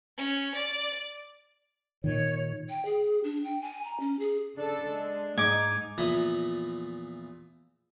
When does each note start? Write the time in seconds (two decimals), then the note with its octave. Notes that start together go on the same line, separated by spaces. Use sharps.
0.17 C#4
0.54 D5
2.04 A#2 D#3 C#5
2.69 G5
2.85 G#4
3.24 D4
3.44 G5
3.62 G#5
3.84 A#5
4.00 C#4
4.19 G#4
4.58 C#3 D4 A4
4.89 G#3
5.38 G#2 D#4 D6 G#6
5.98 E2 A#2 E3 F3 A#5 B5